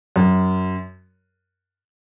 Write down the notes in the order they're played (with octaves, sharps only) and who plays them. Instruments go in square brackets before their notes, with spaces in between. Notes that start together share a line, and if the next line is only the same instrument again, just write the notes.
[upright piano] F#2